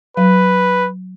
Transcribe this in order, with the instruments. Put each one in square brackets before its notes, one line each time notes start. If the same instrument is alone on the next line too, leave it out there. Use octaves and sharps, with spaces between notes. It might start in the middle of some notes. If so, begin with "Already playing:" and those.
[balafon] F#3 [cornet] B4